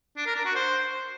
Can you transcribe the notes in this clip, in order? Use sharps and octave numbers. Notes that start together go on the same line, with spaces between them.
D4
A#4
D4
F#4
C5